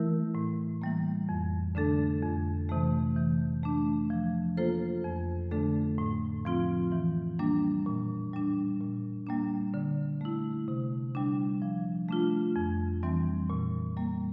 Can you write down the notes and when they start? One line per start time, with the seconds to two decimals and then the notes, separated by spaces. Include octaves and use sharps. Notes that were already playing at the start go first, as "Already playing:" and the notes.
Already playing: E3 A3 E4 A#4
0.35 A2
0.82 E3 G3 A#3
1.29 F2
1.75 D3 A3 D4 A4
2.22 F2
2.69 C3 E3 A3
3.16 E3
3.63 A3 D4
4.10 F3
4.57 A#3 F4 A4 C5
5.04 F2
5.51 D3 A3 D4 A4
5.98 A2
6.45 F3 C4 F4
6.92 E3
7.39 G3 A#3 D4
7.86 A#2
8.33 G3 D4
8.80 A#2
9.27 G3 A#3 D4
9.74 D3
10.21 A3 E4
10.68 C3
11.15 G3 D4
11.62 F3
12.09 A3 D4 F4
12.56 F2
13.03 E3 G3 C4
13.50 A#2
13.97 G3 A#3